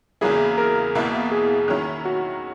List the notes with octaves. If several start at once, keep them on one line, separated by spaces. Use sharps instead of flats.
E2 C#3 F#3 A#3 E4 G#4
A#4
E2 B2 A#3 E4
G#4
D#3 F#3 C#4 E4
F#4